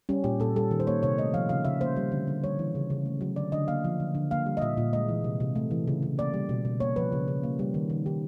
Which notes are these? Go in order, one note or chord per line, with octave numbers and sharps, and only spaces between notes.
G3 C#4
A#2 G4
A#2 A4
G3 A4
D#3
C5
A#3 C#5
C3 C#5
A3 D#5
F3 F5
C#3 F5
C#3 E5
A#3 C5
G3
D3
D3
G3 C#5
E3
C#3
C#3
A3
F#3
D3 D5
D3 D#5
A#3 F5
F3
D3
D3
A#3 F5
G3
D#5
A#2 E5
A#2
G#3 D#5
E3
C3
C3
A3
E3
C#3
C#3
A#3 D5
G3
B2
B2
A#3 C#5
F3 B4
C#3
C#3
A#3
G3
D#3
D#3
D#3 G4